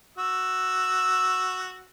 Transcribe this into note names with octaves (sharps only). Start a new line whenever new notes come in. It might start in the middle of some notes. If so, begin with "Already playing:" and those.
F#4 E6